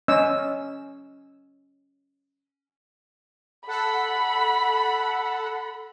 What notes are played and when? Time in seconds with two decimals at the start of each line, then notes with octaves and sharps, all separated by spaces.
0.08 C#4 D#5 E6
3.67 A4 F#5 B5